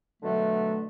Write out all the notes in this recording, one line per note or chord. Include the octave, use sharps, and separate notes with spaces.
B2 D3 F#3 A3